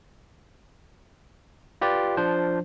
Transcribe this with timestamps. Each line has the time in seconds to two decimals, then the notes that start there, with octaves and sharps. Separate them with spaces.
1.81 F4 G4 B4 D5
2.17 F3 D4 C5